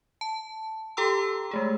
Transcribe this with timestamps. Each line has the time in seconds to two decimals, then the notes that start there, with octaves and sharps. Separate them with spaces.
0.21 A5
0.97 G4 A4 G5 A#5 C6 E6
1.51 G#3 A3 G#4